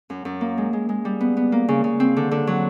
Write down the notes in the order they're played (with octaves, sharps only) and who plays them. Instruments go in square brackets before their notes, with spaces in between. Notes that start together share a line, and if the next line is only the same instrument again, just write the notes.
[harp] F#2
F#2
A#3
G#3
G#3
G#3
G3
B3
B3
A#3
C#3
C#3
C4
D3
D3
F#3